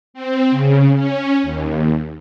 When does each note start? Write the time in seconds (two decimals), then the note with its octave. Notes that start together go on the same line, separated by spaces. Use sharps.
0.14 C4
0.51 C#3
0.94 C#4
1.43 D#2